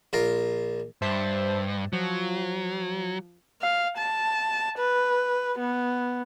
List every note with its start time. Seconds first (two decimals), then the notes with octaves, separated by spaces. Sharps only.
0.13 A#1 F4 A#4
1.02 G2 C5 E5 A5
1.93 F3 F#3
3.62 F5
3.97 A5
4.79 B4
5.59 B3